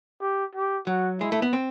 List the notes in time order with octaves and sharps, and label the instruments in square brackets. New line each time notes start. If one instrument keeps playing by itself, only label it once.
[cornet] G4
G4
[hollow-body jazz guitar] F#3 [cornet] F#4
[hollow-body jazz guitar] G#3 [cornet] E4
[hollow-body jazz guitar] A3
B3
C4